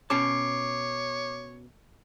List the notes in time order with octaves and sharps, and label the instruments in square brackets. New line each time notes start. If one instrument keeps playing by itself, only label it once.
[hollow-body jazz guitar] B2 C#4 A5 [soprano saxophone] C#5 [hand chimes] D6 C7